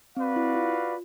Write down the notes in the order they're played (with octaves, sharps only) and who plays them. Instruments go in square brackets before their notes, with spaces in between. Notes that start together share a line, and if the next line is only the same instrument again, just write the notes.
[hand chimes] C4 [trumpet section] F#4 B4 D5 F5
[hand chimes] E4
F4